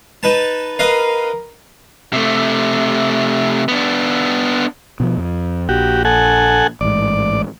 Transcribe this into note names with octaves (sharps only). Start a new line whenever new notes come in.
D#4 B4 A5
A#4 B4 D#5 F5
C3 A3
B3 D4
B2 E3 F3
F2
A#1 F#4 G4
A4 F#5 G#5
A1 G#2 D5